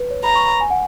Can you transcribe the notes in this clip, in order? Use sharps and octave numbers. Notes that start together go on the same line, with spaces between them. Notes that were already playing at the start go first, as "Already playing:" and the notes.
Already playing: B4
C#5
A#5 B5
C#6
B5
G#5
F#5